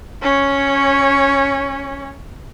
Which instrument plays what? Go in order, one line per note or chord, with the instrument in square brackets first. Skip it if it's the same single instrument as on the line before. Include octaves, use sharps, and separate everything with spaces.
[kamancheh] C#4 C#5